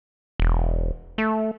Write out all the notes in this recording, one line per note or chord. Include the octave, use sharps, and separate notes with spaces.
E1
A3